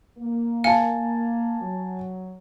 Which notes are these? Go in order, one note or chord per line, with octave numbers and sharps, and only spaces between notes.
A#3
F5 G#5 A5
F#3